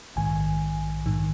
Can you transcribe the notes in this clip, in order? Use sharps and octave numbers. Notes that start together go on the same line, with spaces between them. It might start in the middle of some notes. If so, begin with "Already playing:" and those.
A#1 G#2 D#3 G#5
G#2 D#3